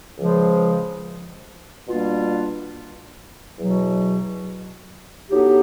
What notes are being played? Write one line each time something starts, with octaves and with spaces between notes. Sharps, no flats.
C#2 C#3 F3 G#3
B2 G3 A#3 D4 F4
E2 B2 F#3
A2 F#3 B3 D#4 G4